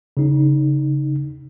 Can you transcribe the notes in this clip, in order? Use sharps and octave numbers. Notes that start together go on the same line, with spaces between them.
C#3 D#4